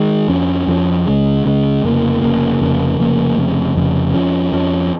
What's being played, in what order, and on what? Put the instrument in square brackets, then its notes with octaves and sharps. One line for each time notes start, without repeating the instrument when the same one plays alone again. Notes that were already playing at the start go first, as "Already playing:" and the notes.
Already playing: [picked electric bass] D#3 G#3
F2 F3 C#4
F2 F3 C#4
C#2 C#3 G#3
C#2 C#3 G#3
F1 F2 C#3 A#3
F1 F2 C#3 A#3
F1 F2 C#3 A#3
F1 F2 C#3 A#3
F1 F2 C#3
F1 F2 C#3
F2 F3 C#4
F2 F3 C#4